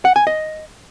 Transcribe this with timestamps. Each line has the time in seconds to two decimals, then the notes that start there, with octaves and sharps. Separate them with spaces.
0.05 F#5
0.16 G#5
0.27 D#5